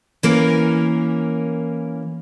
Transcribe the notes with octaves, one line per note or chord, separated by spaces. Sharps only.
E3 A#3 C#4 A#4